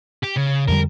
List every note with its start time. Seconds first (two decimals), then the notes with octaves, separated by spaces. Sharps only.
0.24 G4
0.37 C#3
0.68 F2 D3 G3 A#4